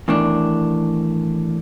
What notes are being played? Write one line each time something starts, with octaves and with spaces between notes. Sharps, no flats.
E2 A2 D#3 D4